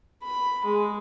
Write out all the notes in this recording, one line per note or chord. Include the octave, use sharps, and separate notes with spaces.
B5
G#3